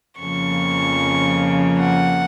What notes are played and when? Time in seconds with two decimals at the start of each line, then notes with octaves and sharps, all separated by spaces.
0.20 F2 C#3 F3 A#3 C#6
1.79 F#5